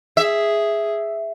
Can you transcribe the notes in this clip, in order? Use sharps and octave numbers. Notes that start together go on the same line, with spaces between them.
G#4 E5